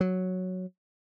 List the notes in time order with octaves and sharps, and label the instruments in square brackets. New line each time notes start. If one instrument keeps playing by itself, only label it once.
[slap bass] F#3